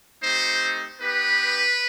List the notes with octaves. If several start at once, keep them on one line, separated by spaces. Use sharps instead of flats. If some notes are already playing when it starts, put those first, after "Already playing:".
A3 C4 D#4 G4 C5
B3 D#4 G4 B4